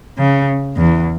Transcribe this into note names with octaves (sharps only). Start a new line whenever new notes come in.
C#3
E2